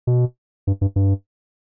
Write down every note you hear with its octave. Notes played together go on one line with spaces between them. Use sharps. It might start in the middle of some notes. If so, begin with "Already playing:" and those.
B2
G2
G2
G2